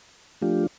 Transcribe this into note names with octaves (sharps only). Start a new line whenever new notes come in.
F3 A3 D4 F4 G4